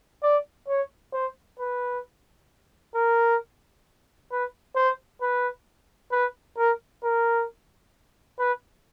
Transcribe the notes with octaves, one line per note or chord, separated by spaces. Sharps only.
D5
C#5
C5
B4
A#4
B4
C5
B4
B4
A#4
A#4
B4